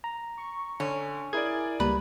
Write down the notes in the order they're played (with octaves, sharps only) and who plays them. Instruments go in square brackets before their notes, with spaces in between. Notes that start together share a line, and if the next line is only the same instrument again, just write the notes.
[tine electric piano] A#5
[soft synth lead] C#6
[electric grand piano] D3 [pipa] C#4
[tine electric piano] E4 A#4 G#6 [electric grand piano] G#4 D5
[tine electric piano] C#2 G3 A#5 [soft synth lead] A#3 [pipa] B4